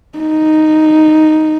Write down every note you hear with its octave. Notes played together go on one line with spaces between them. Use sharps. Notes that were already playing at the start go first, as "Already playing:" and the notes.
D#4